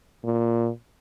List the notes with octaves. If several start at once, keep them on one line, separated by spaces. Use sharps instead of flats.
A#2